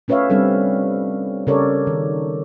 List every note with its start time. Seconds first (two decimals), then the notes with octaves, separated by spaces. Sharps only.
0.08 A3 C#4 B4 C#5 E5 F5
0.30 G3 C4 D4 A4
1.47 C#3 G4 A4 A#4 C#5 D5
1.87 D#3